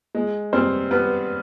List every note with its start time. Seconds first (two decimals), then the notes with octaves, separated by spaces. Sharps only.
0.15 G#3
0.53 G2 C4 C5
0.91 G2 B3 B4